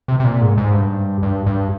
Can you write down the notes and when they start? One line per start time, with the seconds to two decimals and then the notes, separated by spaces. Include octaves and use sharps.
0.08 C3
0.20 C3
0.25 A#2
0.41 G#2
0.58 G#2
0.73 G2
1.23 G2
1.46 G2